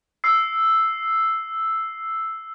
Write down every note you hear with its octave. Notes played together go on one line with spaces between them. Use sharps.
E6 C7